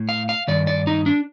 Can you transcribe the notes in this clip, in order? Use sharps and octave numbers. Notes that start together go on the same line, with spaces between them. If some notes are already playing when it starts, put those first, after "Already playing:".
Already playing: A2
F5
F5
G2 D#3 D5
D5
D#4
D4